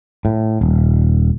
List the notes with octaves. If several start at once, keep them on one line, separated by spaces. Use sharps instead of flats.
A2
D#1